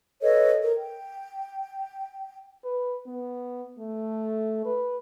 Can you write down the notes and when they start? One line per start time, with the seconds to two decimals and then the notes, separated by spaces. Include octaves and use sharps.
0.22 A4 B4 C#5 D#5
0.62 A#4
0.77 G5
2.64 B4
3.06 B3
3.79 A3
4.65 B4